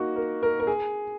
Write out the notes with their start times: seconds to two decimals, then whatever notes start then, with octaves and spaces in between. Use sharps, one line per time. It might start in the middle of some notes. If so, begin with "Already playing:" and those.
Already playing: A#3 D#4 F#4
0.16 A#4
0.43 A#4
0.60 A#4
0.67 G#4